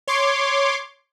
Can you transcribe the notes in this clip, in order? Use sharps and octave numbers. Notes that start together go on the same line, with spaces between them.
C#5 C6 D6